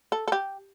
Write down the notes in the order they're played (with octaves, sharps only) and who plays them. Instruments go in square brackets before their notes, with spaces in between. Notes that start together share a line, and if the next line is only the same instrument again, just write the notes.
[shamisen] A4
A4
G4